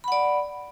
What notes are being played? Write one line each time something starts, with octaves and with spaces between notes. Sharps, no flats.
D5 F#5 B5